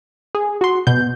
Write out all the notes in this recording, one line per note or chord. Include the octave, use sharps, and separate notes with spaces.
G#4
F#4 C6
B2 G6